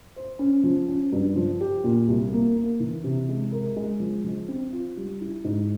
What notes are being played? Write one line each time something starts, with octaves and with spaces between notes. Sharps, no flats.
C5
C#4
F3
C#4
G2
F3
G4
A#2
C2
A#3
A#3
E3
C3
G#3
A#4
G#3
F3
F3
C4
F4
G3
E4
G#2